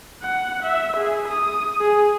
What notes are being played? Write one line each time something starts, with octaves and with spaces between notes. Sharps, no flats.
F#5
E5
G#4
D#6
G#4